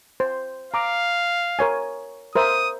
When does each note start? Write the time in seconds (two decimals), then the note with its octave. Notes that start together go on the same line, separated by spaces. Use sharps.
0.20 C5
0.74 F5 A#5 D6
1.59 A#4 C#5 G#5
2.35 A#4 C5 E5 D#6